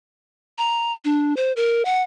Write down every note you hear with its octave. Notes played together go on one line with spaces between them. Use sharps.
A#5
D4
C5
A#4
F#5